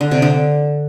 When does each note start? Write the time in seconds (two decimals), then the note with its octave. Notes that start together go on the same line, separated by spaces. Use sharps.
0.01 D3
0.11 C3
0.22 D3